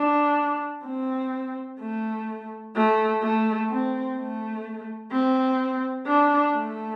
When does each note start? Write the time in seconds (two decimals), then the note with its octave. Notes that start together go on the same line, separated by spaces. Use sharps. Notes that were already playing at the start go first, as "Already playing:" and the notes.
Already playing: D4
0.85 C4
1.80 A3
2.75 A3
3.22 A3
3.70 C4
4.17 A3
5.11 C4
6.07 D4
6.54 A3